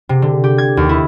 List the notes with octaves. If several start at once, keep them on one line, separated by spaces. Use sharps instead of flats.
C3
D3
G4
G#6
D#2
E4